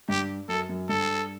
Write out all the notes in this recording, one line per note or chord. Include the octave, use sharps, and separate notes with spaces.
G2 G4
F#2 A4
F#2
G2 A4